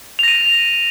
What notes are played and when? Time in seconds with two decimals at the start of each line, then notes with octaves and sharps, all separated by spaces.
0.19 F7
0.23 A#6
0.28 D#7